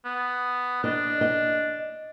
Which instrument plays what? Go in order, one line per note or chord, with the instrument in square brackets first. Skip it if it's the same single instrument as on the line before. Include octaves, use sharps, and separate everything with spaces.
[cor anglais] B3
[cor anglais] D4 [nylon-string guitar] D#5
[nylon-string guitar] D#5